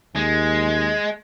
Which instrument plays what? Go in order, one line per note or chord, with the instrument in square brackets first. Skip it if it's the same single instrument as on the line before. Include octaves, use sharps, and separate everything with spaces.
[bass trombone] D#2 [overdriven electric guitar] G#3